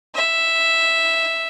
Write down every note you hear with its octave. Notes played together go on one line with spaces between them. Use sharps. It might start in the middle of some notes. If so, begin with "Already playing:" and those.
E5